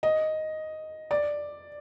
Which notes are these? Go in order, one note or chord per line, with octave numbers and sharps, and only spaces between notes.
D#5
D5